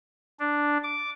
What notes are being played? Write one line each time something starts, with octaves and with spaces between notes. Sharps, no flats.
D4
D6